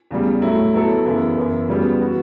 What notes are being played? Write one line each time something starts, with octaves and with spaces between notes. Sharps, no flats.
E2 C#3 G3
A2 F#3 A3 E4
F#3 B3 E4 A4
F#2 C#3 E3 B3 E4
F#2 E3 B3 E4
C#3 G3 B3 F#4
E3 B3 F#4